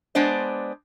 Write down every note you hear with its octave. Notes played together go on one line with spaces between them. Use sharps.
G#3 B3 D4 C5 D5